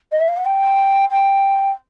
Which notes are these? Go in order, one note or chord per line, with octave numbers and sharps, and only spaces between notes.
D#5
E5
F5
F#5
G5
G5